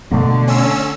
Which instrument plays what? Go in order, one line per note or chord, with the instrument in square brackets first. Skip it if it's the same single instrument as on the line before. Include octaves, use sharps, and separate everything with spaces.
[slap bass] B2 A3 A#3 [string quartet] D3
[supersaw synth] C#4 E6